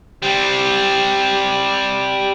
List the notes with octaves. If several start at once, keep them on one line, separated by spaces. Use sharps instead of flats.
G3 C4